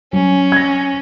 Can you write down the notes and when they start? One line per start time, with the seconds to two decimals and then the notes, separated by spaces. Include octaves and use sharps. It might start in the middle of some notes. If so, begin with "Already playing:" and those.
0.13 F#3 C#4
0.52 G#6 A#6